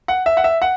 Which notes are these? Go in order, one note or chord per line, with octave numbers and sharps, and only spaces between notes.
F#5
E5
F#5
E5
F#5